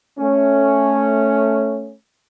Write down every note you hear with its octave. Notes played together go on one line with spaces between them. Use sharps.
A3 C#4